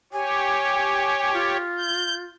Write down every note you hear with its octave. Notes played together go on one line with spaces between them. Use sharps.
G4 C#5 G#5
F4
G6